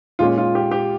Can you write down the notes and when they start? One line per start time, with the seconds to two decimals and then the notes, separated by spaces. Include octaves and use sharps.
0.19 A#2 G#3 C#4 F4
0.38 F4
0.55 G4
0.71 G4